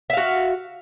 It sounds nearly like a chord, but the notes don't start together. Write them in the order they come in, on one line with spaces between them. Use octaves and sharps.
E5 F5 F#4